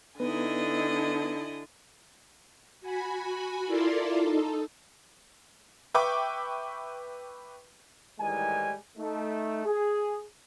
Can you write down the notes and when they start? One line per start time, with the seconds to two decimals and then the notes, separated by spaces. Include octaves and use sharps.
0.20 D3 B3 D#4 E4 B4 D#5 G#5
2.81 F#4 G#5 B5
3.66 E4 F4 A4 A#4 D5 C6
4.20 D#4 A4
5.94 B4 E5 G5 C#6 D6
8.19 A2 D#3 E3 G3 G#3 G#5
8.98 A3 D#4
9.66 G#4